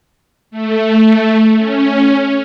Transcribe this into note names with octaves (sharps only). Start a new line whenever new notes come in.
A3
C#4